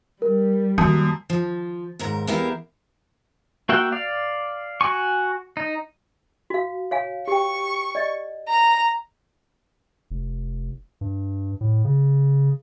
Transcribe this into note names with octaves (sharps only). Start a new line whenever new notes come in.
G3 A#4
F#2 D#3 A#3 A5 D#6
F3
D#2 G#2 A#4
E2 B3 E4 G4 A#4 F5
A#3 F#4 E5 F#5 G5
D5 F5
F#4 G#5 C#6
D#4
F#4 F5
C#5 F5 G#5
G4 G5 C#6
D5 D#5
A#5
F1
G2
A2
C#3